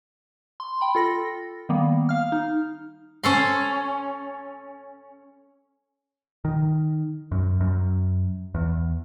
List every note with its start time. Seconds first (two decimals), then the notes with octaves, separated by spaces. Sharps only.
0.60 C6
0.81 G5 B5
0.95 F4 A4 A#6
1.69 D#3 G3 A#3 B3
2.09 F5 F6
2.32 D#4
3.23 C#4 A4 C6
6.45 D#3
7.32 F#2
7.60 F#2
8.55 E2